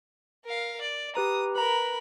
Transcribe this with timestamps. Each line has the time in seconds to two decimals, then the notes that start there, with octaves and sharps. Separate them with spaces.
0.44 A#4 F5
0.81 D5
1.15 G4 B4 A#5 D#6
1.55 A#4 B4 A#5 B5